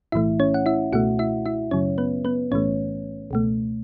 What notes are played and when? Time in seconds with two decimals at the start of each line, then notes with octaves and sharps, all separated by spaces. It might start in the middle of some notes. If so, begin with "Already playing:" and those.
0.12 B1 A2 E3 A3 E4 E5
0.40 C#4 C#5
0.54 F#5
0.66 E4 E5
0.92 C#2 B2 A3 F#4 F#5
1.19 E4 E5
1.46 E4 E5
1.71 F#2 C#3 F#3 C#4 C#5
1.98 B3 B4
2.25 B3 B4
2.51 B1 A2 E3 A3 C#4 C#5
3.31 C#2 B2 A3